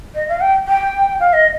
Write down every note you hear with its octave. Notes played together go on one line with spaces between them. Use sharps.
D#5
F5
G5
G5
F5
D#5